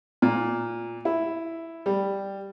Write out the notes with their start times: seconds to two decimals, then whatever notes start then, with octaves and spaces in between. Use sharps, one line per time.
0.22 A#2
1.05 E4
1.86 G3